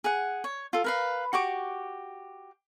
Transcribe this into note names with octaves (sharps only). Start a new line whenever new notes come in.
G#4 F#5
C#5
F4 A4
A#4 B4 F5
F#4 G4 C#6 D6